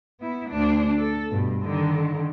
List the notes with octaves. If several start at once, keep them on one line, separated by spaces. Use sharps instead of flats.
B3 E4
D2 D4
A4
G2 B2
D3 D#3